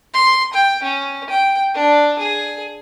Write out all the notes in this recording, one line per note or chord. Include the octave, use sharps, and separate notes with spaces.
C6
G5
C#4
G5
D4
G#4